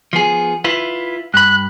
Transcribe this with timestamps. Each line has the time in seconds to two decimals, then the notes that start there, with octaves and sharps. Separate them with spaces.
0.13 F3 B3 G#4
0.64 E4 F4 B4
1.34 G2 B5 F#6